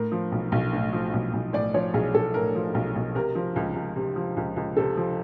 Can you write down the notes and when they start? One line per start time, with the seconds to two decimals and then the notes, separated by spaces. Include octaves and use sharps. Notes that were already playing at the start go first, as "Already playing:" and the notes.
Already playing: A2 A#4
0.12 F3
0.32 B1
0.52 B1
0.73 A2
0.93 F3
1.13 B1
1.34 B1
1.53 A2 D5
1.74 F3 C#5
1.94 B1 G#4
2.14 B1 A4
2.34 A2 A#4
2.55 F3
2.74 B1
2.95 B1
3.15 C3 A#4
3.35 F3
3.56 C#2
3.75 C#2
3.96 C3
4.16 F3
4.37 C#2
4.56 C#2
4.77 C3 A4
4.97 F3